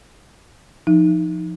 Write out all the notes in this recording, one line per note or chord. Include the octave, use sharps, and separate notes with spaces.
F3 D#4